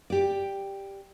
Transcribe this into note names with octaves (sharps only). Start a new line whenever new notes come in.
G4 D5